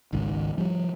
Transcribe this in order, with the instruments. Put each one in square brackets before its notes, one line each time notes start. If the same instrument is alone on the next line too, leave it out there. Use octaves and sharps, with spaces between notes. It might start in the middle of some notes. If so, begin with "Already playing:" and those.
[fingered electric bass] G#1 C#2 D#3
F3 G3